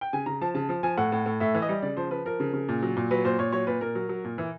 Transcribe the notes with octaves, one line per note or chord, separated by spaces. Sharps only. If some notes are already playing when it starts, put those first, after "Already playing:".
G5
C#3 G#5
C#3 A#5
F3 A5
C#3 A5
F3
F3 G#5
A2 F#5
A2
A2
A2 E5
E3
D#5
G3
C#3 D5
F3 C5
F3 B4
F3 A#4
C#3
C#3
A#2
F#3
A#2
F#3 B4
A#2 C5
A#2 C#5
F#3 C#5
A#2 B4
A#2 A#4
F#3
F#3
A#2
E3